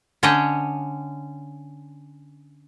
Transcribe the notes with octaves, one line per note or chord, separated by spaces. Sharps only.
D3 C#4 C#5 D#5 G5